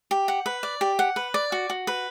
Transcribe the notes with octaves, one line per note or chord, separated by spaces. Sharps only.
G4
F#5
B4
D5
G4
F#5
B4
D5
F#4
F#4
B4